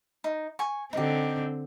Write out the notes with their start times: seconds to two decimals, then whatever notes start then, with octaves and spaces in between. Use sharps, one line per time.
0.24 D#4
0.59 G#5 C#6
0.93 D3 C4 D#4 G4